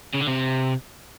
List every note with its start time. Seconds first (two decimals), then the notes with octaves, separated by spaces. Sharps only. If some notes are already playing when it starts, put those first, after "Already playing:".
0.14 C#3
0.20 D3
0.27 C3